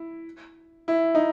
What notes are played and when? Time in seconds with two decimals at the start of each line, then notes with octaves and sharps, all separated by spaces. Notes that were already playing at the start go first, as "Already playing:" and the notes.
Already playing: E4
0.88 E4
1.15 D#4